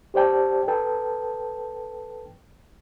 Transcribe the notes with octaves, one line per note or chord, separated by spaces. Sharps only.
G4 C5 D5 G5 A5
A4 B4 G5 A5